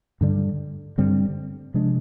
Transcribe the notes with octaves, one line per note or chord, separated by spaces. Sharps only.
G2 D3 G3
G2 D3 G3 C4
C3 F3 G#3 D4